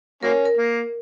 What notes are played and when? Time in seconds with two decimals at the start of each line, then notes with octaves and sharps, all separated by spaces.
0.23 F#3 A#3 C#4 A#4
0.46 A#4
0.57 A#3